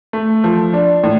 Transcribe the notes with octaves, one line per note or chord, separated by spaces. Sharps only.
A3
F3
D4
A2